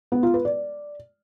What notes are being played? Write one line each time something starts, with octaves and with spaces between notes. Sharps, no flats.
B3
F4
B4
D5